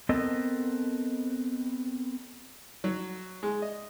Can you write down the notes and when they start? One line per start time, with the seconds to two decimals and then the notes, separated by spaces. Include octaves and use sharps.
0.09 B3 C4 A4 A#4 D#5
2.84 F#3
3.43 G#3
3.62 D#5